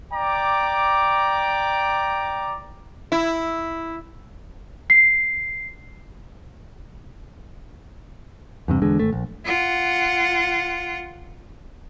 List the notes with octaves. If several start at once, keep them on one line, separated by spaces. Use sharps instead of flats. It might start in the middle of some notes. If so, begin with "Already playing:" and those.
D5 G5 A#5 D6
E4
C7
E2 G2 C3
E2 D3 G#3
G#1 A3
A#1
F4 F#5